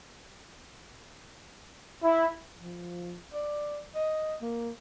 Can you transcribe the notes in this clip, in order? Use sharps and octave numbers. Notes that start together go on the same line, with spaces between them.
E4
F3
D5
D#5
A#3